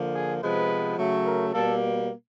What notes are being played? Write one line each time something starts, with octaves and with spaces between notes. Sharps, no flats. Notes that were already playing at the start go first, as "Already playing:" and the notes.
Already playing: D3 F3 A#3
G#4
C3 F3 G#3 B3 B4
C#3 F#3 A3
A#4
B2 G3 A#3 A4